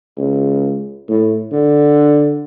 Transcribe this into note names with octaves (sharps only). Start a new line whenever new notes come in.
C#2
A2
D3